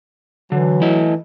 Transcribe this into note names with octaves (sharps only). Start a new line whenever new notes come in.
D3 E3 F#3
A3 E4 D#5